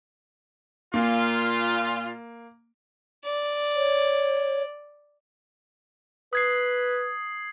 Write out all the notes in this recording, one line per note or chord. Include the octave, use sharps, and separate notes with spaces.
A#2 A#3 F4
D5
C#5
B4 D#6 G#6 C7